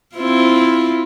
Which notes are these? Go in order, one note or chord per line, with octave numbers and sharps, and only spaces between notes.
C4 E4 F4